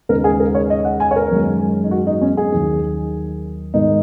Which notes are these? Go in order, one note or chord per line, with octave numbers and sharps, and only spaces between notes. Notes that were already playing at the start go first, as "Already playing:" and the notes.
D#2 C#3 G#3 A#4
G#4
A#4
C#5
D#5
F#5
G#5
C#5
A#4
F#2 D#3 G#3
D#4
F#4
D#4
C#4
G#4
D#2 D#3 F#3
G#2 D#3 G#3 D#4